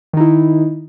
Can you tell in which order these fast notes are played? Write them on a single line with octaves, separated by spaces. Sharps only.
D#3 D#4 E4